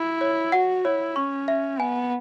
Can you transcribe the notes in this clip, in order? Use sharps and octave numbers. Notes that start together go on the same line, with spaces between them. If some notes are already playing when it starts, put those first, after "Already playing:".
Already playing: E4 B5
C#5
F#4 F#5
E4 C#5
C#4 C#6
E5
B3 G#5